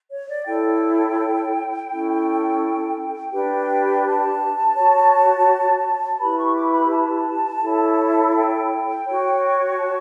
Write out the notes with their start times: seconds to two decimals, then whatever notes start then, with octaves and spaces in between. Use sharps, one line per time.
0.10 C#5
0.28 D5
0.46 E4 A4 C#5 G5
1.89 C#4 E4 A4
3.32 D4 G4 B4 G5
4.04 A5
4.76 F#4 C#5
6.19 E4 G4 B4 B5
6.37 C#6
6.54 D6
6.72 B5
6.90 A5
7.62 E4 A4 C#5
8.34 G5
9.05 F#4 C#5
9.77 A5